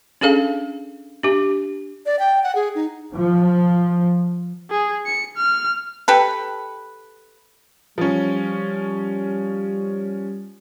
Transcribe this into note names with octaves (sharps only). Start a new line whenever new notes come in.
C#4 D4 G#4 A4 F5
D4 G4
D5
G5
F#5
G#4
D#4
F3
G#4
C#7
F6
G4 A4 B4
F3 G3 C#4